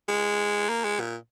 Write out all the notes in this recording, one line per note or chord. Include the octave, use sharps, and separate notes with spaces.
G#3
A#3
G#3
A#2